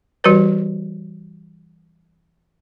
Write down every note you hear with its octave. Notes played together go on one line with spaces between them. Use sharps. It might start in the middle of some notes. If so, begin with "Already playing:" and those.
E3 G3 F#4 G4 B4 C#5